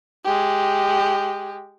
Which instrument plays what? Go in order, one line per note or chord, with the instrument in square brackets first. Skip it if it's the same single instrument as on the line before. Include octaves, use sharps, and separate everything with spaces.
[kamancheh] G#3 G4